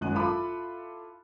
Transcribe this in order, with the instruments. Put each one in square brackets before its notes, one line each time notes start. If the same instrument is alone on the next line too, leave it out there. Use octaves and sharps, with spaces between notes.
[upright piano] G#1 F#2 F#6 D#7
E4 F4 A4 B5 D6